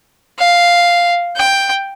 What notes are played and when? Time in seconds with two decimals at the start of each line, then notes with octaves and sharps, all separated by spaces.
0.39 F5
1.37 G5